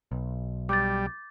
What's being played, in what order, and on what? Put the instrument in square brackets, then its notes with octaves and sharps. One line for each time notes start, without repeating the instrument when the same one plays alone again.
[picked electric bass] B1
[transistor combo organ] G3 [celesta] D6 G6 A6